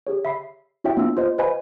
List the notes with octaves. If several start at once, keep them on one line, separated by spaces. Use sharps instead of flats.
G4 G#4 C#5
E5 B5 C7
E4 F#4 C#5 E5 G5
A#3 B3 D4 F4 E5 E6
F4 C5 D#5
B4 C5 D#5 F5 G#5 B5